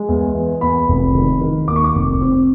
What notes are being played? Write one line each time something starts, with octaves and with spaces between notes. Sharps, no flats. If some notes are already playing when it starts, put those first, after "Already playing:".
Already playing: G#3
E2
E3
E2 B5
F1
D#3
D#3
D#2 D6
C#6
D6
F1
C4